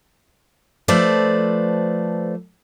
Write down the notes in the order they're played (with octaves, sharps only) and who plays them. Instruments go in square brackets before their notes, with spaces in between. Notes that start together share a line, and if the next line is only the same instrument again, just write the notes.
[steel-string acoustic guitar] F3 A3 A4 B4 C5 D5